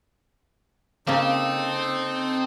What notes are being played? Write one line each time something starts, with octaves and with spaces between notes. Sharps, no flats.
C#3 A#3 C4 D#4 A4